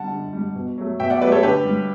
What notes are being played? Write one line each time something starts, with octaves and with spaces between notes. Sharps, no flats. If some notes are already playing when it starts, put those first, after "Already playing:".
Already playing: D3 G3 F#5 A5
D3
G3
B2
F#3 A3
B2 E5 G5
D5 F#5
F#3 A3 B4 D5
A4 C#5
D3 G4 B4
G3